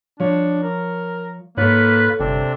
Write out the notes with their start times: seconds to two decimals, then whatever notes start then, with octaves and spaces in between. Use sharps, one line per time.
0.20 F3 D4 C#5
0.63 A#4
1.57 G#2 A#3 F4 A4 B4 C#5 B5
2.20 G1 C3 C4 D4